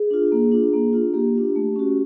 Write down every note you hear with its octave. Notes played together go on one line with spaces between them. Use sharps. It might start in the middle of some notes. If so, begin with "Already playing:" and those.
Already playing: G#4
D4 F4
A#3
D4 F4
A#3
D4 F4
A#3 G4
D4 F4
A3
C#4 F#4